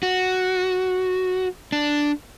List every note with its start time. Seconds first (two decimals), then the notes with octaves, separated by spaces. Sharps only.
0.03 F#4
1.72 D4